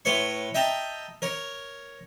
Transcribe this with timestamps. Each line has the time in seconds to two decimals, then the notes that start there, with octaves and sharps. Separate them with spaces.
0.05 A2 B4 C#5 C6 C#6
0.54 D#5 E5 G5 A5 A#5
1.22 A#4 C#5